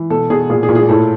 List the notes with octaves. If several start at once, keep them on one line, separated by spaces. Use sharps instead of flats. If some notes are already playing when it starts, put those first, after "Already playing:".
Already playing: E3
B2 A4
B2 G#4
A#2 G#4
G#4
A#2
G#4
A2 A4